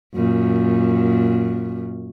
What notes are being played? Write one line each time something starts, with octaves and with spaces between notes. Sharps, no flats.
F#2 A#2